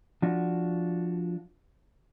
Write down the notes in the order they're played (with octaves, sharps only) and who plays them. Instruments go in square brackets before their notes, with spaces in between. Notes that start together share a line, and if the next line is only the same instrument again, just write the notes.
[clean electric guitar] F3 D4 F#4